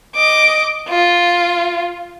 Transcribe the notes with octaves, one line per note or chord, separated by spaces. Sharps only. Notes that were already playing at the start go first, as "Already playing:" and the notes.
D#5 D6
F4